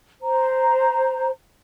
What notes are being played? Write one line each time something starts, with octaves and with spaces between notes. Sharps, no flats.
C5 A#5